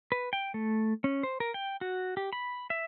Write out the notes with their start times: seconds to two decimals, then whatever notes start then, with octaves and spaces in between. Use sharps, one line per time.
0.12 B4
0.33 G5
0.54 A3
1.04 C#4
1.23 C5
1.40 A#4
1.54 G5
1.81 F#4
2.17 G4
2.33 B5
2.70 E5